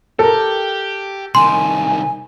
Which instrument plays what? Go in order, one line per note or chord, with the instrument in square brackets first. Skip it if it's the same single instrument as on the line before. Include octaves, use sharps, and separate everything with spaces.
[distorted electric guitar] G4 [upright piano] A4 A#4
[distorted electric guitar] C2 D#3 [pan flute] G#5 [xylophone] C6